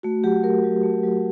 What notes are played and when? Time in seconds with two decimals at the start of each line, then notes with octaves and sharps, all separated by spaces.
0.03 A3 F#4
0.24 F#3 G4
0.43 A3 A#4
0.64 F#3
0.83 A3
1.03 F#3